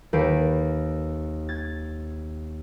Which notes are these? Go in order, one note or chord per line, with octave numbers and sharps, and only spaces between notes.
D#2 B4 G6 C7 D7
G#6 A6